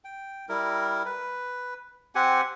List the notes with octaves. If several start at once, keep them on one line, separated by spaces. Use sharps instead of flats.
G5
G3 E4 A#4
B4
C4 G4 F#5 G#5